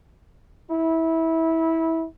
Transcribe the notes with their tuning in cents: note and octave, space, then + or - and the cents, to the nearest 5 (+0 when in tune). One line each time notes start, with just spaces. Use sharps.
E4 -20